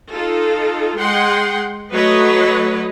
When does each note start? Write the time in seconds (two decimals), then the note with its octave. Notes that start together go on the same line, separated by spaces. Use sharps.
0.11 D#4 F4 A4
0.98 G#3 F#5 G5 C6
1.92 F#3 A3 B4 C#5 D#5